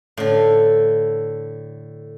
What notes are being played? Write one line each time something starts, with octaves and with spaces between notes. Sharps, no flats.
A2 D3